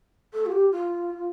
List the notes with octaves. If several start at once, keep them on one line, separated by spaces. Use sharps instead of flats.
A4
F4
G4
F4